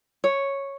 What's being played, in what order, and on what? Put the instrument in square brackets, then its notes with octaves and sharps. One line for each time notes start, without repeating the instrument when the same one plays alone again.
[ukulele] C#5